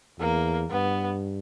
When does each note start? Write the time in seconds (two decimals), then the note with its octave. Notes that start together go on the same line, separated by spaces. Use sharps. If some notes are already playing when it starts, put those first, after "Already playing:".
0.19 E2 A#3
0.70 G2 B3